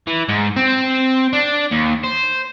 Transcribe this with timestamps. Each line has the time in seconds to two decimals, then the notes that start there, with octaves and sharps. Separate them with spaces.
0.07 E3
0.29 G#2
0.56 C4
1.33 D4
1.71 D#2
2.03 C5